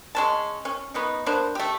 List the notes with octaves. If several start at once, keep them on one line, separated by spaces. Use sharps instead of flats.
G#3 C#4 A5
C#4
B3 C#4 D#4
A#3 B3 D4 C5
A3 G4